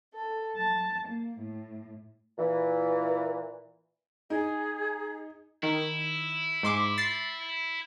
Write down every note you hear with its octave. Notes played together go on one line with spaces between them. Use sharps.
A4
A5
A#3
A2
A#2 E3
D#4 G#4
D#3 E4
G#2 C6 D6
A6 C7